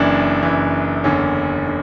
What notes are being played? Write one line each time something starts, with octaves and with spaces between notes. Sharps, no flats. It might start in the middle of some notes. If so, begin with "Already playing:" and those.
Already playing: F#1 F#2 E3 D4
F#1 F#2 E3
F#1 E2 D3 C#4
D3